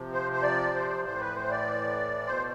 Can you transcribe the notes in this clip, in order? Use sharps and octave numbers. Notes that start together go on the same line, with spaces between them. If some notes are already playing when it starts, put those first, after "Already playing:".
Already playing: C3 F3
C5
C5
D5
C5
A2 E3 C5
B4
C5
D5
B2 C5